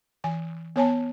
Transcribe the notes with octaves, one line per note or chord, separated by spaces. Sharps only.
E3 G#5
B3 C#5 G#5 A5